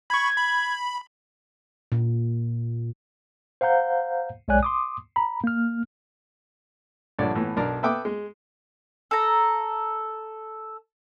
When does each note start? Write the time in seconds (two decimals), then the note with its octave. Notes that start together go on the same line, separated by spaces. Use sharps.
0.10 B5 C#6 G#6
0.37 B5
1.92 A#2
3.61 C5 F5 F#5 A#5 G6
4.48 B1 G#3 C#5 D5 G#5 F#6
4.63 C6 D6 D#6
5.16 A#5 B5
5.44 A#3 F6
7.19 A#1 G2 D3 C#5 D5
7.35 A2 E3 B3
7.57 B1 D4 A#4 D5 A#5 F6
7.83 A4 B4 E5 G5 D6 D#6
8.05 G#3
9.11 A4 A#5